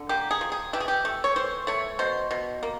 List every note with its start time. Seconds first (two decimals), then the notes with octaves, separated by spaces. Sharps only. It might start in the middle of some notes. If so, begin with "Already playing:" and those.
Already playing: D3
0.09 A#3 G4
0.31 G#4
0.41 F3
0.52 G#4
0.73 E3 G4
0.80 G#4
0.88 G4
1.05 A3
1.24 C#5
1.36 E3 C5
1.67 A3 C#5
1.99 B2 C5
2.31 B2
2.63 A#3